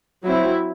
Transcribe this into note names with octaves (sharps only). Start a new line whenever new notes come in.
F#3 C4 E4